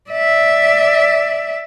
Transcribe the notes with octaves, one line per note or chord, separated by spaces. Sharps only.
D5 E5